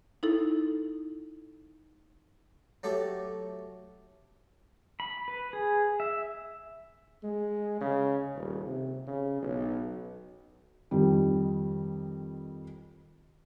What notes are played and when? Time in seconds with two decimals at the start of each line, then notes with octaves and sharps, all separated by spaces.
0.23 D#4 E4 A4
2.83 F#3 A3 G4 A4
5.00 B5
5.28 B4
5.53 G#4
6.00 E5
7.23 G#3
7.81 C#3
8.35 D#1
8.66 C3
9.07 C#3
9.42 B1
10.91 F2 D#3 G3